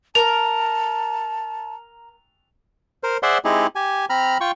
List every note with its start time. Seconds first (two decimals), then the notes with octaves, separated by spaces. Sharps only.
0.15 A#4 A5 F7
3.03 A#4 C5
3.23 G#4 C5 D5 E5 F#5 C6
3.45 G#3 C4 D#4 E4 G4 G#4
3.75 G4 G#5
4.10 C4 A#5 B5 F6
4.41 F4 G5 C#6